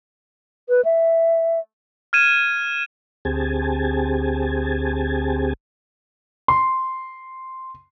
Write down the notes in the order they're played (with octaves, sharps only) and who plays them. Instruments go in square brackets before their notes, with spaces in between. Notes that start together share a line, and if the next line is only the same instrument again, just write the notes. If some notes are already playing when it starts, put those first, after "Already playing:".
[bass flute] B4
E5
[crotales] F6 G#6 D#7 E7
[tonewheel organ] D2 C4 G4 G#4 G#5 A5
[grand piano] C6